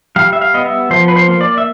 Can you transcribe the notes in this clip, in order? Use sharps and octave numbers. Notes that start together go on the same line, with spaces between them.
G3 F5
E5
F5
B3 D#5
E5
F3 C5
B4
C5
A#3
D5
E5